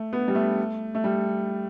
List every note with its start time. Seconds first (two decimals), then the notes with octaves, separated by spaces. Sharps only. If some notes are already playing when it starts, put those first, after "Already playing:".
Already playing: A3
0.13 B3
0.28 G3
0.35 A3
0.95 A3
1.04 G3